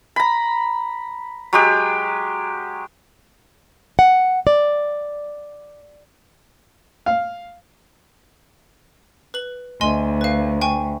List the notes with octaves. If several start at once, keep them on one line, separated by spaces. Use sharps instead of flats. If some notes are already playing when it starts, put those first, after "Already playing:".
A#5 B5
F#3 G#3 G4
F#5
D5
F5
B4 F#7
D2 D#5 G#5 C6
B4 F5
G5 G#5 C#6